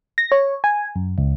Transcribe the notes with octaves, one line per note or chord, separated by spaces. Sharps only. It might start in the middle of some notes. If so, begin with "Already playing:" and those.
A#6
C#5
G#5
F#2
C#2